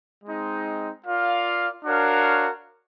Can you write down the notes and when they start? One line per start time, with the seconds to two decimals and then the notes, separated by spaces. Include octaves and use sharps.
0.24 G#3 C4 D#4
1.05 F4 A#4 D5 F5
1.85 D4 F#4 A#4 C#5 F5